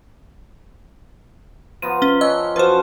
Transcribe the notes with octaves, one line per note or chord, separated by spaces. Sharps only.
F3 B3 A#5 D#7
C#4 G7
C#4 D4 D#5 E6
F#2 F3 B4 C5 A5